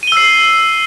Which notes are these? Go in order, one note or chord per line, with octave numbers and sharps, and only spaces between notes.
E6 C7 D#7 G7